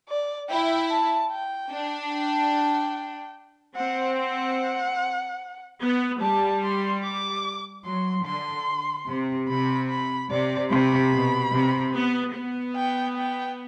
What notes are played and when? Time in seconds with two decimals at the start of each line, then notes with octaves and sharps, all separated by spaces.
0.09 D5
0.49 E4 G5
0.90 A5
1.31 G5
1.72 D4
2.13 G5
3.76 C4 F#5
4.17 F#5
5.81 B3
6.21 G3 A5
6.63 C6
7.03 D6
7.85 F#3 C6
8.25 D3 C6
9.07 C3
9.48 C3 B5
9.89 B5
10.30 C3 D5
10.71 C3 B5
11.11 B2
11.53 C3
11.94 B3
12.34 B3
12.76 G5
13.16 G5